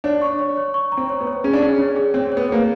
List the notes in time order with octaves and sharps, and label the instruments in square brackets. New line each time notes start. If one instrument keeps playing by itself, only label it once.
[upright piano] D4 [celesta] C#5
[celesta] C#6
C#5
C#5
C#6
A#5
[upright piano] C4
[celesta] C#5
[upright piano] B3
[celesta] C#5
[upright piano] C#4 [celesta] G#4
[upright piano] D4
[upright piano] C#4 [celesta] G#4
[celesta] C#5
G#4
[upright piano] C4 [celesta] C#5
[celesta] C#5
[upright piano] B3
[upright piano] A#3 [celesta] G#4